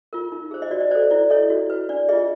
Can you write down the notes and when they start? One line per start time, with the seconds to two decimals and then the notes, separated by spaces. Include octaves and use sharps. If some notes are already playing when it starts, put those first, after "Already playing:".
0.13 F4 A#4
0.32 D#4
0.51 G#4 C5
0.62 D#5
0.71 F#4 D5
0.81 D#5
0.91 A4 C5 D5
1.11 E4 D5
1.30 A4 C#5 D#5
1.50 F#4
1.70 B4
1.89 D4 D5
2.09 F4 G#4 D#5